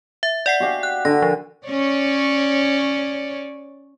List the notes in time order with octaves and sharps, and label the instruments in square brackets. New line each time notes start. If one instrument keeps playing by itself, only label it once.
[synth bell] E5
D5 F#5 C7
[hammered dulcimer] F#4 G4 F5
[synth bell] F#6
[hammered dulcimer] D3 [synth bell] A#6
[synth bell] F3
[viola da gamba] C#4 C#5 D5